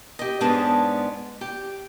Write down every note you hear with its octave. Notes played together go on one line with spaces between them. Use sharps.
G4 D#5
G#2 G#3 B3 C#4 D4 A5
G4